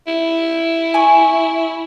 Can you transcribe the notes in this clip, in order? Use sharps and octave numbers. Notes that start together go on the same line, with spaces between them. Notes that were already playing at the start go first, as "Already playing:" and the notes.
E4
G#5 C#6 D6